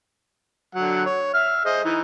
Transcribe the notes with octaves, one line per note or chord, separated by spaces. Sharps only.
D3 F#3 F#5
C#5
E5 F6
G#4 C5 D#5
E3 D#4